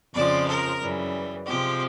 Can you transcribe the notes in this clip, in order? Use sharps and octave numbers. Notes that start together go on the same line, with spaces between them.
F2 C#3 F3 G#3 D5
A#4
F#2 C#3 E3 G3
C3 F3 G#3 G4